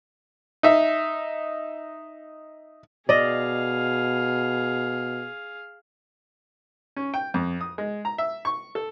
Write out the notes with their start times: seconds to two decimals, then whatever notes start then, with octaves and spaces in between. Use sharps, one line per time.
0.63 D#4 E5
3.09 B2 G#4 D5 D#5 F5
6.96 C#4
7.14 G5
7.34 F2
7.61 D#6
7.78 G#3
8.05 A#5
8.18 E5
8.45 C#6
8.75 A4